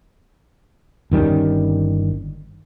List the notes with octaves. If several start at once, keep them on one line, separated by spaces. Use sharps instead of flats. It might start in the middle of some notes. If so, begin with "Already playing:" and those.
G1 D#3 G3 C#4